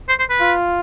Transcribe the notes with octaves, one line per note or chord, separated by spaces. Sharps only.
C5
C5
B4
F4